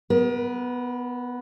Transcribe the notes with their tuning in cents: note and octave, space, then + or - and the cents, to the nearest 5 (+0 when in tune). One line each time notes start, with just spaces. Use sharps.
B3 +0 A#4 +40